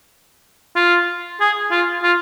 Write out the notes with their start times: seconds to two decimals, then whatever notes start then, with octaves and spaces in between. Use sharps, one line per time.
0.76 F4
1.40 G#4
1.71 F4
2.03 F4